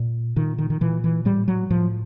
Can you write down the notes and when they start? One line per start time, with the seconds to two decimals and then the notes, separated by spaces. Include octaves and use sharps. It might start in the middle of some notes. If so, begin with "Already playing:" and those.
Already playing: A#2
0.36 A#2 D#3
0.58 D#3
0.70 D#3
0.81 A#2 E3
1.04 E3
1.25 A2 G3
1.48 F#3
1.70 A2 F3